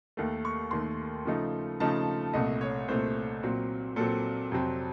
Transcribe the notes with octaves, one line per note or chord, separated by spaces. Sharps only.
D#2 D#3 A3
C#6
D#2 D#3 A3 C6
C#3 F3 A3 D#4
C#3 F3 A3 D#4 A5
C2 A#2 A3 D#5
C#5
C2 A#2 A3 C5
A#2 F#3 C4
A#2 F#3 C4 A4
F2 C3 F#3 C4